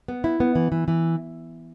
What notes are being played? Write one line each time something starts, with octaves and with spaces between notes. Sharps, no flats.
B3
E4
B3
E3
E3
E3